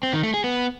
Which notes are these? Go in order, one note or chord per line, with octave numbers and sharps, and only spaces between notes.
C4
D#3
A3
G#4
B3